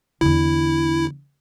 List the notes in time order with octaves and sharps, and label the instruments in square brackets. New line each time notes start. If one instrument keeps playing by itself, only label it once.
[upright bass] E2 D3 [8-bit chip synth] E4